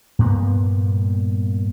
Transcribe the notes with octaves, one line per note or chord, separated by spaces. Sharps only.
G2 A#2 A#3 B3